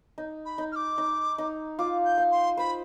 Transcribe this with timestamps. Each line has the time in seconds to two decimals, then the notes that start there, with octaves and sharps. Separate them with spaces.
0.18 D#4
0.45 B5
0.58 D#4
0.72 F6
0.76 D6
0.98 D#4
1.38 D#4
1.79 F4 D6
2.05 G6
2.18 F5
2.31 C6
2.57 C5 B5